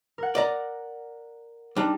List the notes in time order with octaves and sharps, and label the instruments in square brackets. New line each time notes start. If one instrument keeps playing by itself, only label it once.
[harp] A#4 F#5
[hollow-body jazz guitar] D5 D#5 A#5
[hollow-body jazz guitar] G3 D4 [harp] D#4